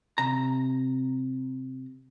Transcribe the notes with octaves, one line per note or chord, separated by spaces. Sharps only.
C3 A#5